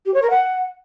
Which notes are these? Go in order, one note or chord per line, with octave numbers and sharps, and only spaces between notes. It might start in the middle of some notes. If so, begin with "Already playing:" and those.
G4
C#5
A#4
F#5